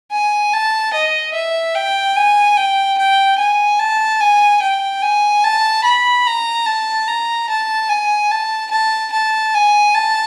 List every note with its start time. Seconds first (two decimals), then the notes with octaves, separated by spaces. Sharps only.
0.12 G#5
0.53 A5
0.93 D#5
1.34 E5
1.75 G5
2.16 G#5
2.57 G5
2.98 G5
3.38 G#5
3.79 A5
4.21 G#5
4.62 G5
5.02 G#5
5.44 A5
5.84 B5
6.27 A#5
6.66 A5
7.07 A#5
7.49 A5
7.89 G#5
8.31 A5
8.71 A5
9.12 A5
9.54 G#5
9.94 A5